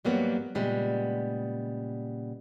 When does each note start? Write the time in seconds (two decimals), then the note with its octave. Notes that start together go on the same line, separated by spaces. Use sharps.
0.05 G#2 F#3 G3 A#3 B3
0.55 A#2 C#3 G3 G#3 B3